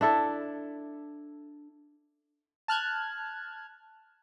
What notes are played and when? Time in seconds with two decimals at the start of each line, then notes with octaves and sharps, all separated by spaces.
0.01 D4 E4 A4
2.68 A5 F6 F#6 G#6